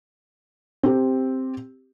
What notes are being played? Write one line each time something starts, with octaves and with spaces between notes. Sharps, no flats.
C4 G4